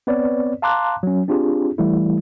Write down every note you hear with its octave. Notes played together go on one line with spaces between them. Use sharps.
B3 C4 B4 C#5 D5
F5 A5 A#5 C6 D6 F#6
F#3 C#4
C4 D4 F4 G4 G#4
E3 G3 A3 E4